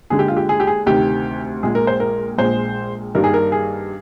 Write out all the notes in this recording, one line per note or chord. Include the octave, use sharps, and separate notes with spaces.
D#2 D3 G#3 G#4
G4
F4
G4
G#4
G4
G#4
D2 C3 D#3 G4
A#1 A#2 G#3 G#4
A#4
C5
A#4
A#1 A#2 G#3 C5
G2 D#3 G3 A#3 A#4
G#4
A#4
G#4